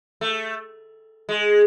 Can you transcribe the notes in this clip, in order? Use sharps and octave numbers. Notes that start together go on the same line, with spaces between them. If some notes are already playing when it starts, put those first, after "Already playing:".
A3
G#3